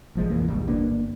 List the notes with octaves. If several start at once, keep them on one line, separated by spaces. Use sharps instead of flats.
A1 F3 G#3
B1 F2 E3 A#3
A#1 D#2 G#2 G3
G1 A#3 B3 D4